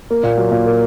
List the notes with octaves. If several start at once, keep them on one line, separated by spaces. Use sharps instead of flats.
A#3
A#2
F#3
A#2
A#3